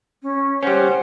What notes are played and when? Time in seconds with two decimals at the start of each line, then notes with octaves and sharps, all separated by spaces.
0.22 C#4
0.63 G3 C#4 C5 F#5